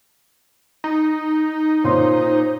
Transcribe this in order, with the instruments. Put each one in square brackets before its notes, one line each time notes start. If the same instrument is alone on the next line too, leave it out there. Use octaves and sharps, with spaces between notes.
[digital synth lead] D#4
[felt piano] A#2 C#4 C6 [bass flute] C5